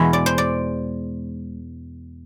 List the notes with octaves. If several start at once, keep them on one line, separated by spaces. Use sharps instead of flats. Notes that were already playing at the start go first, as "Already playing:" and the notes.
Already playing: E2 B2 G#3 E5
D5
C5
D5